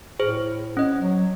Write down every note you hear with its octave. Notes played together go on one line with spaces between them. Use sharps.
A2 G#4 C5
C#4 D#5
F#3